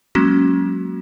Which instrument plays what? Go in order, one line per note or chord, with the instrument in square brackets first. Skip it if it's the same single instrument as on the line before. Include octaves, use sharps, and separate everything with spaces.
[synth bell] F#3 G#3 A#3 C#4 F#4